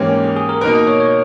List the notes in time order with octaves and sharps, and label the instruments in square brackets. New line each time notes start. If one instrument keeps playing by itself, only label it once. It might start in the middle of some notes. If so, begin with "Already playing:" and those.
Already playing: [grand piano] G#2 E3 A#3 C#4 [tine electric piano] G4
[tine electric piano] G#4
G#4
A#4
[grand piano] A#4 [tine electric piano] B4
[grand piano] B2 A#3 D#4
[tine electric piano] D#5
C#5
C#5